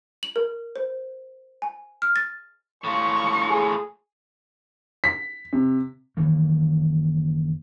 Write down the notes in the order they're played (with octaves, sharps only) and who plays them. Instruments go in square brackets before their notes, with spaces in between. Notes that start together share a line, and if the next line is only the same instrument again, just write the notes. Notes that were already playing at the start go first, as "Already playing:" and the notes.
[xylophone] F#7
A#4
C5
G#5
F6
A6
[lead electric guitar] A2 F4 [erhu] C#6
[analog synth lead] G#4
[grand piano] B6
C3
[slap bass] F#1 D#3 E3 A#3